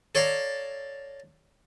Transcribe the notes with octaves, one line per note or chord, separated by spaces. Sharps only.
A4 C#5 D5 F5 A#5